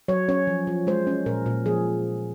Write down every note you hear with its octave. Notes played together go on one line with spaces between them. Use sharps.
F#3 C#5
C#4 C#5
F3
F3
G#3 C5
C#4
A#2 A#4
A#2
F3 G#4